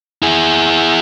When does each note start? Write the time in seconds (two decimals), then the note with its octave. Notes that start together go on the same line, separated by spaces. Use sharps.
0.22 E4 G#4